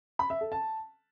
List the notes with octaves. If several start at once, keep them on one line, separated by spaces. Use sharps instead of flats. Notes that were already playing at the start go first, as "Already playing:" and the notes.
B5
E5
A4
A5